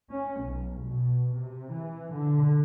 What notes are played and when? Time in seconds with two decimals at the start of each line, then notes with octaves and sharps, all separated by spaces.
0.13 C#4
0.42 B1
0.83 B2
1.36 C3
1.72 E3
2.13 D3